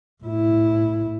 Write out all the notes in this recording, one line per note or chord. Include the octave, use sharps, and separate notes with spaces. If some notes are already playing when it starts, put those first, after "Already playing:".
A2 E4